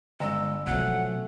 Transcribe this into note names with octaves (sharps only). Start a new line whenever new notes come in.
G1 G#3 E6
B2 F3 F#3 A3 C#4 F#4 F#5